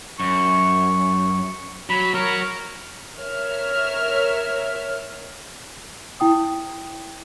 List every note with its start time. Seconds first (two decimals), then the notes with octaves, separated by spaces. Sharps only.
0.19 F#2 C#6
1.89 F#3 B5
2.14 F#3 A#4 C#5
3.17 A#4 C#5 E5 F6
6.20 E4 G5 D#6